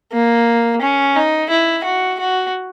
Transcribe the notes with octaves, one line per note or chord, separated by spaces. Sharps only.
A#3
C#4
D#4
E4
F#4
F#4